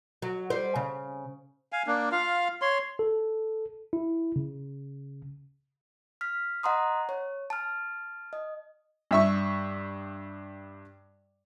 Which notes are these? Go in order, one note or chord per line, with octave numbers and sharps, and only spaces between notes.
F#3
G3 C5
C#3
F5 G#5
A#3 D4
F4 F5
C#5 C6
A4
E4
C#3
F6 B6
D#5 F#5 A#5 C6 D#6
C#5
A5 F6
D#5
G2 E5 C#6